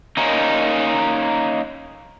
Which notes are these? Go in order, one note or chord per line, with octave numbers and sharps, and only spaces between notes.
A#3 C#4 D#4